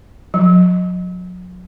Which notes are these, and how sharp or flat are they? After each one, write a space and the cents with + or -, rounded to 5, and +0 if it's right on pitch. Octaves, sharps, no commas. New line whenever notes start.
F#3 -40